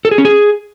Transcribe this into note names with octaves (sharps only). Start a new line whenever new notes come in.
A4
G#4
C#4
G#4